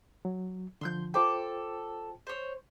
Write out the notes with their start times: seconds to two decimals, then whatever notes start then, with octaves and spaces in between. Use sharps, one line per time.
0.25 F#3
0.81 D3 F3 C6 E6 G6
1.14 F4 A4 C5 G5 D6
2.27 C5 C#5